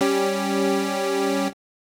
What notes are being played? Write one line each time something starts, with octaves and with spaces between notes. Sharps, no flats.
G3 C#4 G4